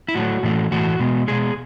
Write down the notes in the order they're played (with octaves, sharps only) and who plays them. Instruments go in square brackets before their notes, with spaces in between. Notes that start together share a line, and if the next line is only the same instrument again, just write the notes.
[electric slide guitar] E4
A2 F#3 A3 F#4
A2 E3 A3
A2 E3 A3 F#4
B2 G#3 B3
B2 G#3 B3 G#4